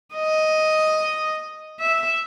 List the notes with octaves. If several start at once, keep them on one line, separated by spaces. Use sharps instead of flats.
D#5
E5